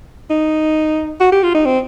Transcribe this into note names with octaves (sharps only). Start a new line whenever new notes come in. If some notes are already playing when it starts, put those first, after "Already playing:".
D#4
F#4
G4
F4
D#4
C4